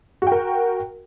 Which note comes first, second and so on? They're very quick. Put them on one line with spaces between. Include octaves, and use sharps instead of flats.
F#4 G5 A#4